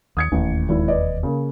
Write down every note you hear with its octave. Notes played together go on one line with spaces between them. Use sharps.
D#2 D#6 G#6 C#7
E1 A1 D#2
G#1 E4
B4 D5 D#5
C#3 A#3